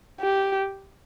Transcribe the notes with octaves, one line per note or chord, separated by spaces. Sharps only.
G4